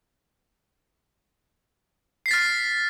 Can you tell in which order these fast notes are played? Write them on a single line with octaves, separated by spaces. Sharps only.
C7 B6 A6 F6